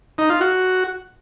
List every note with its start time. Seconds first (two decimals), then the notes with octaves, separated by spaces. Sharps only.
0.18 D#4
0.30 F4
0.41 F#4